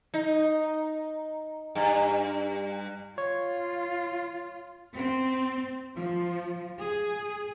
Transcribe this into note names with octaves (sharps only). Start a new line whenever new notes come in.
D#4
G2
F4 C#5
C4
F3
G#4